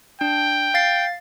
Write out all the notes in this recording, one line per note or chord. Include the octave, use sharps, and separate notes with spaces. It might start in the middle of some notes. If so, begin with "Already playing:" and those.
D4 G5
F5 A6 C7